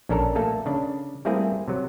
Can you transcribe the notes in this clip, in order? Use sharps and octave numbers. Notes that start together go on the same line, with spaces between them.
A#1 C#4 D4 A4 A#4 A#5
A3 A#3 A4 A5
C#3 D4
G3 A3 A#3 C4 E4 G#4
C3 F#3